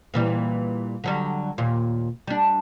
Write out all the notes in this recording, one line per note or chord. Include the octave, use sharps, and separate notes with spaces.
A#2 E3 G3
D3 F#3 G3
D#2 A#2
G3 D4